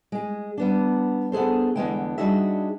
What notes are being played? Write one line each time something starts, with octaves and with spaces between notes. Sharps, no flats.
G#3 G#4
G3 B3 D4
B3 D4 G#4 A4 C5
E2 G2 D3 G#3 B3 G5
G3 D4 D#4 F#4 G#4 E5